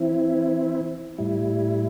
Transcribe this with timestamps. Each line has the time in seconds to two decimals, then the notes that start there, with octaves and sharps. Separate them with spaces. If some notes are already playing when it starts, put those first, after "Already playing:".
Already playing: E3 C4 E4
1.18 A2 G3 E4